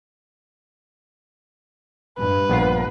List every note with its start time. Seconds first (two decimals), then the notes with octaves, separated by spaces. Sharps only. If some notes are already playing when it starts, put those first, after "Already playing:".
2.18 G2 B4
2.49 A#1 B3 F4